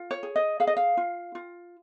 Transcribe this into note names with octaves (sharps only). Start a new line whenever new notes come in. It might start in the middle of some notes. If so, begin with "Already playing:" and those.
Already playing: F4
C#5
G#4
D#5
G#4 F5
D#5
F5
F4
F4